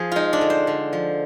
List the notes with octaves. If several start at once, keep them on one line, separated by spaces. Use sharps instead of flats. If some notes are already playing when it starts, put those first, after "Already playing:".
Already playing: F3 G#4
G#3 D#4 F4
D4
D3
C5
D3
F3